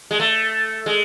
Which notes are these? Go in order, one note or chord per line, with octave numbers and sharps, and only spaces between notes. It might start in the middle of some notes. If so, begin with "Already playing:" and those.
G#3
A3
G#3